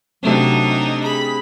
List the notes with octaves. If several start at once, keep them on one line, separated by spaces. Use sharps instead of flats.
C3 F#3 A3 C4 D4 D#4
G#4 B5